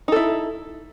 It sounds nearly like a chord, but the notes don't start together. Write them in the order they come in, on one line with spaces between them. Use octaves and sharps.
D#4 A4 E4